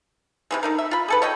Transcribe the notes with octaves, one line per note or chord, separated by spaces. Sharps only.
C3 E3 G#3
D3 D#4 A#4
E5
F4 B5
G#4 A4 B4
C#5 D#5 G5